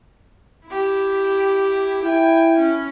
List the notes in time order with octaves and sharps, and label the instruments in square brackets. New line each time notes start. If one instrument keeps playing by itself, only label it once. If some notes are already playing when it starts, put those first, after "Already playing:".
[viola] E4 G4
[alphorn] E4 [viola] G5 G#5
[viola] C#4